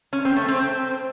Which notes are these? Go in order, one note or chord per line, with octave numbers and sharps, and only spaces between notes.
C#4
C4
A3
C4